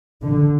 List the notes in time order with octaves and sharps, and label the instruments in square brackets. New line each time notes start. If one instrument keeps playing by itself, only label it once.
[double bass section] D3